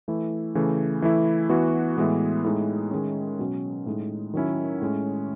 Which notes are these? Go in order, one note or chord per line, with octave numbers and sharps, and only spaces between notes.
E3 A3 E4
C#3 E3 A3
E3 A3 E4
E3 B3 F#4
A2 E3 G#3 B3
A2 G#3 D#4
D#3 G#3 C#4
B2 F#3 C#4
A2 G#3 D#4
D#3 F#3 C#4 E4
A2 G#3 C#4